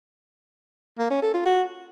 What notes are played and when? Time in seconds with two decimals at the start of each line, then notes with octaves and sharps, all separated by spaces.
0.99 A#3
1.10 C#4
1.22 A4
1.34 F4
1.46 F#4